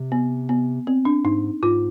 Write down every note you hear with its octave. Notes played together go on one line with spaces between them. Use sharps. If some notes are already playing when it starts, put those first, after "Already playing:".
Already playing: C3
B3
B3
C4
D4
G#2 D#4
G#2 F4